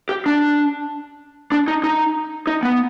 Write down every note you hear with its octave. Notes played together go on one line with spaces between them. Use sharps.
G4
D4
D4
D#4
D#4
D#4
B3